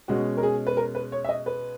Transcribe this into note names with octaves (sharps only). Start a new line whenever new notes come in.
B2 G#3 C#4 F#4
A#4
G#4
B4
A#4
B4
C#5
E5
D#5
B4